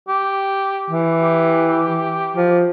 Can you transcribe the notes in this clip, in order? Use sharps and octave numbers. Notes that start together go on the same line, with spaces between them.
G4
E3
G4
F3